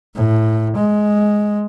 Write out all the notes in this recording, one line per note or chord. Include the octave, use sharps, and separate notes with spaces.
A2
G#3